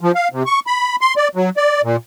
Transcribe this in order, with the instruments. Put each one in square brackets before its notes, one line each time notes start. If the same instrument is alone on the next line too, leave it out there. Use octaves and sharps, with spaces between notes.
[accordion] F3
F5
C3
C#6
B5
C6
D5
F#3
D5
A#2